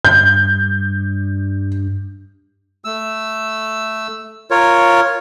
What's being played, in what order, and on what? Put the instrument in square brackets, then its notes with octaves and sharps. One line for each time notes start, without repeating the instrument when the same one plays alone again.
[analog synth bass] G2 [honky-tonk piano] G6
[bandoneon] A3 E6
F4 A#4 C#5